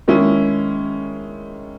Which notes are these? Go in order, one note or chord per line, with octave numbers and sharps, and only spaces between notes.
D#3 G#3 C#4 E4